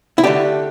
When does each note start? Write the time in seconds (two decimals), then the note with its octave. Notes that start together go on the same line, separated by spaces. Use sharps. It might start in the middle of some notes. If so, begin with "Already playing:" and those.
0.18 E4
0.23 D3 A3 D4 G4